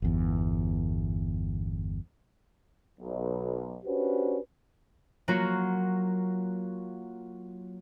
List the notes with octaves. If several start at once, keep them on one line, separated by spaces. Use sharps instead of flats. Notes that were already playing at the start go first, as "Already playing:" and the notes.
G1 E2
B1
C#4 D4 F#4 G4 B4 C5
F#3 A#3 F4 F#4